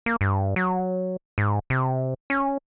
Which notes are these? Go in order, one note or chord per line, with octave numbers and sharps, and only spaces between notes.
A#3
G2
F#3
G#2
C3
C#4